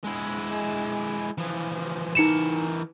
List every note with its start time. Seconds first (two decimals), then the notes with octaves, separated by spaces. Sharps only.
0.04 G#3 E4
1.38 E3 F3
2.15 E3 D#4 A#4 C#7 E7